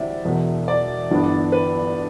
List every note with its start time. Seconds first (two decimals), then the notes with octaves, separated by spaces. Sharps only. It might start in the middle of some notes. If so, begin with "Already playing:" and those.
Already playing: D2 C3 E3 G3 D5 E5
0.24 E1 E2 B2
0.68 D5
1.11 G1 G2 E3 B3 D4
1.52 B4